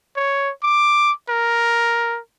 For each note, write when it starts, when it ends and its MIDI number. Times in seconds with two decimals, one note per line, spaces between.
0.16 0.51 73
0.63 1.12 86
1.30 2.18 70